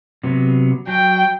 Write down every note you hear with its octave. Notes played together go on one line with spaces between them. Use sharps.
C3 F#3 B3
F#3 G5